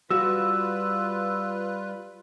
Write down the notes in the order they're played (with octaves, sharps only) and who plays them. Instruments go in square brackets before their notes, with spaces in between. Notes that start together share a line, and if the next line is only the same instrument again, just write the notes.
[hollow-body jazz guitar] G3 F#4 [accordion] F4 B4 [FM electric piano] E6